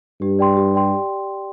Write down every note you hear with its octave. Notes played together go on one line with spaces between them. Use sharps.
G2 G4
D5 G5 C6
G4
D5 G5 C6